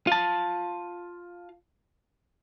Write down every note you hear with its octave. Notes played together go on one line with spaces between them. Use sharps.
F4 A5